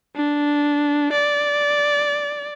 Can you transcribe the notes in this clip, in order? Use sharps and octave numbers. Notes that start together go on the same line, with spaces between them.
D4
D5